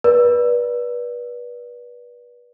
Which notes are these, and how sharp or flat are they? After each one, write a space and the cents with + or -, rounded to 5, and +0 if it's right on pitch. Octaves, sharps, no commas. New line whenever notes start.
B4 -30 D5 +0